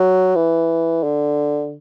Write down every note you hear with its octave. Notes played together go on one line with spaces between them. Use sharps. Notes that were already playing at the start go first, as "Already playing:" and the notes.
Already playing: F#3
E3
D3